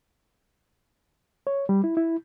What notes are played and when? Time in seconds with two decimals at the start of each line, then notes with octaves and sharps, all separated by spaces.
1.47 C#5
1.69 G3
1.84 E4
1.97 E4